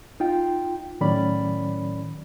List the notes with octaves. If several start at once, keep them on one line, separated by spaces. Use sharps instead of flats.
D#4 F4 G5
A2 D#3 F#3 C#4 D5 B5